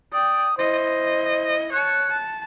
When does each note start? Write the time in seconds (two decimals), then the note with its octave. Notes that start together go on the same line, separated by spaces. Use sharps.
0.13 D5 G5 D#6
0.57 E4 C5 D#5
1.72 C#5 A5 F#6
2.10 A5